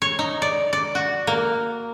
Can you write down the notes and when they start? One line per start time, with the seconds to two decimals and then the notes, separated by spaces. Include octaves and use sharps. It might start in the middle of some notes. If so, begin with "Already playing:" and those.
0.02 C#5
0.19 D#4
0.42 D5
0.73 D5
0.95 F#4
1.27 A#3